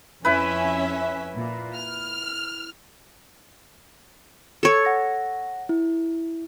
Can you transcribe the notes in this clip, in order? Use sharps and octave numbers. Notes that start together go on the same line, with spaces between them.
F2 C#4 E4 B4 E5
A#2
F6
A4 C#5
F#5 A#6
E4